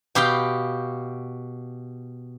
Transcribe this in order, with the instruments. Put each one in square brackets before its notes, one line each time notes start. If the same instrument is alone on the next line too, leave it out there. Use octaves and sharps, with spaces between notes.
[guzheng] B2 G4 F5 G5